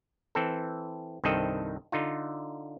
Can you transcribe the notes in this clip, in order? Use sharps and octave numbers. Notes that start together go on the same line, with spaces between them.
E3 C4 A4
C2 G2 D#3 C4 A4 D#5
D3 D#4 F4